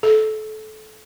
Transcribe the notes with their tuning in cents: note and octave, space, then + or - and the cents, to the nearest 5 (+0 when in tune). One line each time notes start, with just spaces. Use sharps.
A4 -25